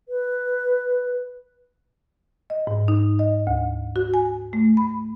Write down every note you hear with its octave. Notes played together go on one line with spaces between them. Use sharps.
B4
D#5
G#2
D#4
D#5
D2
F#4
G#5
A3
B5